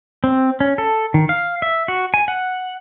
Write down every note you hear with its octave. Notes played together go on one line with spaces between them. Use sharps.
C4
C#4
A4
D#3
F5
E5
F#4
G#5
F#5